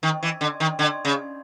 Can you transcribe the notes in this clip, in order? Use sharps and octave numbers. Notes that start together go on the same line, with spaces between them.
D#3
E3
D3
D#3
D3
C#3